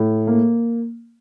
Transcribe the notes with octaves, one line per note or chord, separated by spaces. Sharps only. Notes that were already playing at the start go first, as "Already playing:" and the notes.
Already playing: A2
A#3